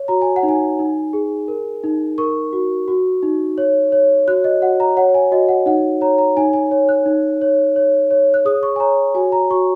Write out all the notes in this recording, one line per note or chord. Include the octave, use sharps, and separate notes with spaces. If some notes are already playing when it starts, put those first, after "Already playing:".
Already playing: C#5
F#4 A#5
G#5
F#5
D#4
G#5
D#4
G#4
A#4
D#4
A#4 C#6
F#4
F#4
D#4
C#5
C#5
F#4 F#6
D#5
F#4 F#5
A#5
C#5 F#5
G#5
F#4 D#5
F#5
D#4 F#5
C#5 A#5
A#5
D#4 G#5
G#5
C#5
F#6
D#4
C#5
C#5
C#5
F#6
G#4 D#6
C#6
G#5
C#5 A#5
F#4 G#5
A#5
F#4 C#6